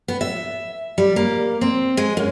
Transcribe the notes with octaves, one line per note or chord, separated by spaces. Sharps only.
B3
E5
G3
A#3
C4
G#3
F#2